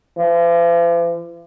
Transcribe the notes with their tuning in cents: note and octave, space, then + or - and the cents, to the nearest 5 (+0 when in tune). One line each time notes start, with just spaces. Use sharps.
F3 -45